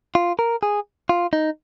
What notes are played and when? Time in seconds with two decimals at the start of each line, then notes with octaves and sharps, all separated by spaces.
0.15 F4
0.39 A#4
0.63 G#4
1.09 F4
1.33 D#4